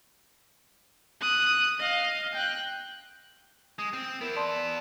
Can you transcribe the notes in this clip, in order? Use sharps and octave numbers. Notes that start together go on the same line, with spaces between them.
D#6 F#6
D#5 F5
G5 F#6
G#3 D#6
C4
B3 E4 A#4 D7
D5 A5 C6